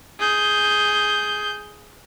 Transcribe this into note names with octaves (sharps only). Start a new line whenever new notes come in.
G#4 G6